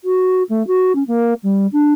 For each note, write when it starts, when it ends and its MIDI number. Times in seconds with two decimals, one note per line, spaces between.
0.04 0.43 66
0.50 0.65 57
0.67 0.93 66
0.95 1.03 61
1.07 1.34 58
1.43 1.67 55
1.72 1.94 62